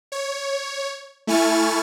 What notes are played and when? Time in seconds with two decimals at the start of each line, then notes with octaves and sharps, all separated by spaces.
0.12 C#5
1.27 A3 E4 G#5 C#6 F6 A6